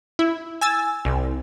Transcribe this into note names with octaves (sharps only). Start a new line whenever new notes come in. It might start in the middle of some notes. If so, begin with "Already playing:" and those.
E4
G#5 E6 A6
C2